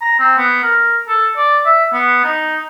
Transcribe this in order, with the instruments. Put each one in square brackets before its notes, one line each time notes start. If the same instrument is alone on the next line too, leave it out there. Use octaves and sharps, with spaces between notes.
[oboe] A#5
C4
B3
A#4
A4
D5
E5
B3
D#4